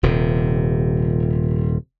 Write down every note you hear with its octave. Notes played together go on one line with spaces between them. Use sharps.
D#1 C3